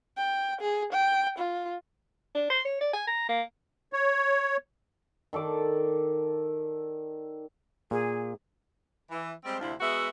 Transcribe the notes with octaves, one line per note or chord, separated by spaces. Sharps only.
G5
G#4
G5
F4
D4
C6
C#5
D5
G#5
A#5
A#3
C#5
D#3 A4 D5 D6
A#2 G#4
E3
G3 G#3 C4
D2 C3 F3 D4 E4
G#3 B3 F#4 E5